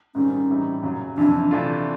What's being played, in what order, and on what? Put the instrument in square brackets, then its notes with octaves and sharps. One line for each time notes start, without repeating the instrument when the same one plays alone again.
[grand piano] G#2 D#3 G3 C4 [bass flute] C#4
[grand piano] A2 E3 G3 C4 D#4
F#2 C#3 F#3
[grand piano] F2 C3 E3 [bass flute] D4
[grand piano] C3 E3 A3 D4 F4